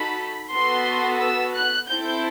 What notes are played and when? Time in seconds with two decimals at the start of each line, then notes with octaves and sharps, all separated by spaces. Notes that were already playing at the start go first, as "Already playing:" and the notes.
Already playing: D#4 F#4 A4 B5
0.53 B3 F#4 A4 C6
1.21 E6
1.55 F#6
1.88 C4 E4 A4 G6